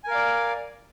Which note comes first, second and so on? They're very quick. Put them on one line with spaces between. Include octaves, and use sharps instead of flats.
G#5 A#4 F5 D5